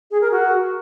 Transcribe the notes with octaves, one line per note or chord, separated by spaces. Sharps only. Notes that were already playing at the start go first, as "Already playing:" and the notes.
G#4
A#4
F#4